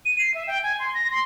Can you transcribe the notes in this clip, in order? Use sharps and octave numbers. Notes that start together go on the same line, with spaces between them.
D#7
C7
E5
G5
G#5
C6
A#6
C6